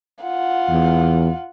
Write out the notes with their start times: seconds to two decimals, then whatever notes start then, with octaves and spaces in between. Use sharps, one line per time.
0.23 F4 F#5
0.69 E2